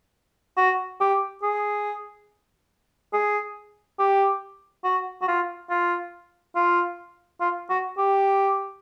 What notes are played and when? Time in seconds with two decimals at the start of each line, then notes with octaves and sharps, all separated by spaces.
0.57 F#4
1.00 G4
1.42 G#4
3.13 G#4
3.99 G4
4.84 F#4
5.22 F#4
5.28 F4
5.70 F4
6.55 F4
7.41 F4
7.70 F#4
7.98 G4